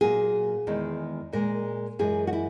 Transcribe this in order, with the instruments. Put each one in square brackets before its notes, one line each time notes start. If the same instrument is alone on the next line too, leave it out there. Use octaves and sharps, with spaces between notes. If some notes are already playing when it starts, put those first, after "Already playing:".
[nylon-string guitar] A#2 F#3 A#3 G#4
E2 D#3 G#3
A#2 G#3 A#4
F#2 E3 G#3 G#4
F#4
E4